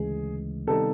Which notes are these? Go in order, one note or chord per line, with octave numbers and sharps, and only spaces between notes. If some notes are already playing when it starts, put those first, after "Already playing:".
Already playing: D2 C#3 E3 G#3 G#4
C3 D#3 G3 B3 D#4 A4